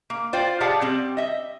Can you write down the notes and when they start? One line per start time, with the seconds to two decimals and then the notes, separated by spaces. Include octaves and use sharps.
0.10 A#3
0.33 F4 C5 D5 F5 G5
0.61 G4 G#4 D5 F5 F#5 A5
0.81 G3 C4
1.17 D#5 E5